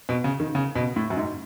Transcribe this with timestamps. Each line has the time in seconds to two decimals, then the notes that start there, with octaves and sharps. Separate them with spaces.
0.09 B2
0.24 C#3
0.40 D#3
0.55 C#3
0.75 B2
0.96 A2
1.10 F#2
1.17 G#2